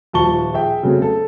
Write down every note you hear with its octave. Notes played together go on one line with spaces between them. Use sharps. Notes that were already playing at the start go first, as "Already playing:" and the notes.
D#1 F3 A5 C#6 G7
G#4 E5 G5
C#3 F#3 A3 C4
A4